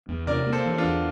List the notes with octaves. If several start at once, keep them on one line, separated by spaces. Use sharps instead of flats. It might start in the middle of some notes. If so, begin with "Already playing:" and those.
E2
C3 A#4 D5
A#3
A4 C5
E3
D4 F4
E2